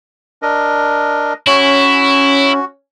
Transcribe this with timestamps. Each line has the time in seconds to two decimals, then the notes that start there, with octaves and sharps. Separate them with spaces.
0.42 D4 A#4 D#5
1.47 C#4 E4 F#4